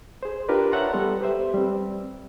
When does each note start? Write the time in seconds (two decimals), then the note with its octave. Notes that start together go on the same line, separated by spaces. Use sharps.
0.23 G#4 C5
0.49 D4 F4 G4 A#4 B4
0.71 C#5 E5 F#5 A5 A#5 C6
0.93 G3 B3 A4
1.21 G4 B4 C5 E5
1.54 G3 C4